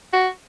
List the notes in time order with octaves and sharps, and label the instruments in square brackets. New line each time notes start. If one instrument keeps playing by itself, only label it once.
[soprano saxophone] F#4